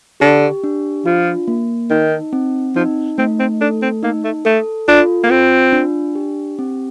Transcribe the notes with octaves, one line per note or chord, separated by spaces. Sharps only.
D3 G4
D4
F3 F4
A#3
D#3 D#4
C4
F3 D#4
A3 C4
C4
D4 A4
C4
A#3 D#4
A3
A3 A4
D4 F4
A#3
C4 F4
D4
G4
C4